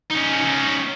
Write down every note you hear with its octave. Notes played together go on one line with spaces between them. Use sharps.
C#4 D#4